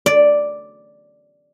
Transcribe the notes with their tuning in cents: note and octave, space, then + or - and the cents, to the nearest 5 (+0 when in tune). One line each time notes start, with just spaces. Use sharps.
D5 +0